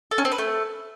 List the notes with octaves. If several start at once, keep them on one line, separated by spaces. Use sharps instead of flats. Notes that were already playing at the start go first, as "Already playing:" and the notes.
A4
C#4
C4
B4
A3